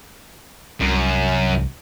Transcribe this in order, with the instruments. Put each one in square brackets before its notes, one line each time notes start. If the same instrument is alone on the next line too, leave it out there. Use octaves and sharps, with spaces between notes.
[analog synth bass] C2 [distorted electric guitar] F#2